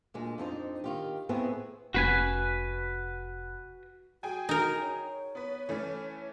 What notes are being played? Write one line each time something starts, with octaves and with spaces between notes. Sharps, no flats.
D2 A#2 G#3
F2 D4 D#4 C5
D#3 F4 G4
A2 B3 C4 E4 G#4
F1 C4 C#4 F#4 B4 G#5
F#4 G#4 G5 G#5
D#4 A#4
C#5
B3 B4
E3 A3 C#4